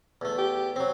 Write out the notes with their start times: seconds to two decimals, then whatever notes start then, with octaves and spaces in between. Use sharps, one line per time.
0.21 E2 A3
0.38 G4
0.76 F#3 C4